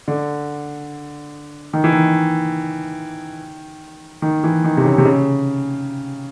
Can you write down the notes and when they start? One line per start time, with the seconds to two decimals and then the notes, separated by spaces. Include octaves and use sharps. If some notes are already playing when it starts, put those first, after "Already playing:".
0.08 D3
1.73 D#3
1.84 E3
1.93 D#3
4.22 D#3
4.44 E3
4.64 D#3
4.77 C3
4.85 C#3
4.98 C3
5.05 C#3